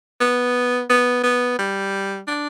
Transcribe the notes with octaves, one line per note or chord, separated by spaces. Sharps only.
B3
B3
B3
G3
D4